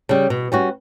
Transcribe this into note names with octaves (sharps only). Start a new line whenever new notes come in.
C#3 G3
B2
G3 C#4 F#4